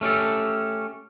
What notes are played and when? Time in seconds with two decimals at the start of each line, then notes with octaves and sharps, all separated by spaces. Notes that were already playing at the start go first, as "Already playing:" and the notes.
0.01 A3 C#4 G4 A4